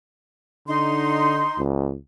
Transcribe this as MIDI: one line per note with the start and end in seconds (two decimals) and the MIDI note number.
0.67 1.46 50
0.67 1.60 63
0.67 1.60 84
1.58 1.96 37